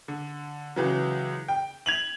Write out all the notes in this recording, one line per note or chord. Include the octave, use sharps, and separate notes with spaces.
D3
C#2 E3 F#3
G5
G#6 F7 F#7